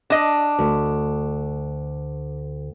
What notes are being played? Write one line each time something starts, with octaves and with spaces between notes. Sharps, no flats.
D4 D#5
D2